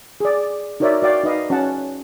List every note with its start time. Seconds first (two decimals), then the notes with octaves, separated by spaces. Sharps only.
0.20 G#4 D5
0.80 D#4 F#4 A#4 C#5 D5 E5
1.02 F#4 D5 F5 G5
1.24 D#4 B4 D#5 F5
1.50 C#4 F#4 C#5 F#5 A5